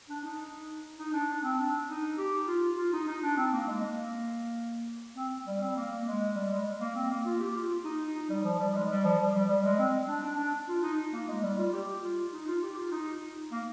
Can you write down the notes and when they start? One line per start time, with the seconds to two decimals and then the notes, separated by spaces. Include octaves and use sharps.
0.09 D4
0.24 D#4
0.99 D#4
1.13 D4
1.29 D4
1.43 C4
1.58 D4
1.89 D#4
2.18 G4
2.48 F4
2.77 F4
2.93 D#4
3.07 D#4
3.23 D4
3.37 C4
3.52 A#3
3.67 G#3
3.82 A#3
5.16 C4
5.47 G3
5.60 C4
5.76 A#3
6.06 G#3
6.35 G3
6.50 G#3
6.80 A#3
6.95 C4
7.10 A#3
7.25 F4
7.40 G4
7.55 F4
7.84 D#4
8.15 D#4
8.29 G3
8.44 F3
8.59 G3
8.74 G#3
8.89 G3
9.04 F3
9.19 G3
9.34 G3
9.49 G3
9.64 G#3
9.79 C4
10.08 D4
10.23 D4
10.38 D4
10.69 F4
10.83 D#4
11.13 A#3
11.28 G#3
11.43 G3
11.58 F4
11.73 G4
12.03 F4
12.32 D#4
12.47 F4
12.62 G4
12.77 F4
12.92 D#4
13.51 A#3